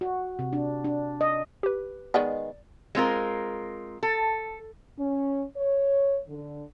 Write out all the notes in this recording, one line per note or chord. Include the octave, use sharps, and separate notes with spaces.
F#4
C3
D4
D4
D#5
G4 B4
D#3 G#3 B3 D5
G#3 C4 F4 A#4
A4
C#4
C#5
D3